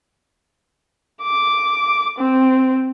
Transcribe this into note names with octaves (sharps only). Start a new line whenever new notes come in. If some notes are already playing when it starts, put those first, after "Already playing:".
D6
C4